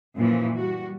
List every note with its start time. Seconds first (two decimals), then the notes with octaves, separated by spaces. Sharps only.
0.16 F#2 A#2 E3 F3
0.56 G3 F#4